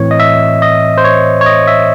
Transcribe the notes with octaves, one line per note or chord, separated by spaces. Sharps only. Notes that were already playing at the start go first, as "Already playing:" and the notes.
Already playing: A2 E3 C4 C#5
D#5
E5
D#5
C5
C#5
C#5
D#5
E5